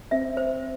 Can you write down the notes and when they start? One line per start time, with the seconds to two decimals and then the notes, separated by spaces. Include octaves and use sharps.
0.11 C4 E5
0.37 C5